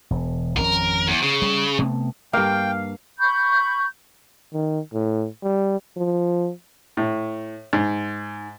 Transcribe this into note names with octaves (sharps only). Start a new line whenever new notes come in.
E1
G#1 F2 C#4 A#4
E2
C#3
G3
C3 A3 B3
G2 A#3 F5 G5
B5 C#6 G6
D#3
A2
G3
F3
A2
G#2